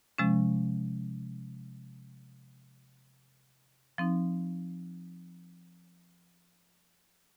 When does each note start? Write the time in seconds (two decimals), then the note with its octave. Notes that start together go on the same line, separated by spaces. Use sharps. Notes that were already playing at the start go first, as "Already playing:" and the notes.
0.18 C3 F3 G#3 C#4
3.98 F3 C4 D#4